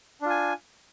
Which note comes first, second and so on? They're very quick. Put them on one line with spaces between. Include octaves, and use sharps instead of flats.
D4 F4 G#5